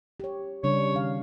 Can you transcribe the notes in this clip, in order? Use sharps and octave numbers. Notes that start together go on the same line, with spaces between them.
G4 C#5
C#3 G3 D4 C#5
D#3 F5